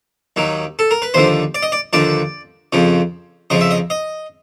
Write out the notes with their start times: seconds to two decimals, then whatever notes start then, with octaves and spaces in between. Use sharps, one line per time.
0.36 D#2 D#3 F#3
0.79 A4
0.91 A#4
1.02 B4
1.14 D#2 D3 F3 C5
1.55 D5
1.63 D#5
1.72 D5
1.93 D#2 D3 F3 D5
2.73 F2 C#3 F3
3.50 F2 C#3 F3 D#5
3.61 E5
3.71 D#5
3.90 D#5